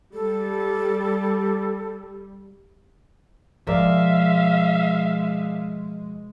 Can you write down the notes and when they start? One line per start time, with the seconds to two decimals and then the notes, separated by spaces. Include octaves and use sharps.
0.14 G3 A4
3.67 B2 F3 G#3 G#4 A#4 D5 E5 F5